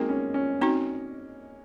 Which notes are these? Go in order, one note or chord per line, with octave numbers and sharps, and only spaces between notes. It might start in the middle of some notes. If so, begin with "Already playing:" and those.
Already playing: G#3 A#3 C4 D#4 F#4
C#4
C#4
C4 D#4 F#4